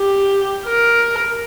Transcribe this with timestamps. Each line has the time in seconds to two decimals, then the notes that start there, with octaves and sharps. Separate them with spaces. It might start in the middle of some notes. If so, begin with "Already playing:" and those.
Already playing: G4
0.66 A#4